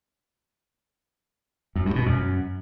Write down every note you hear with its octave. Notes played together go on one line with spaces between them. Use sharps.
F#2
G2
B2
F#2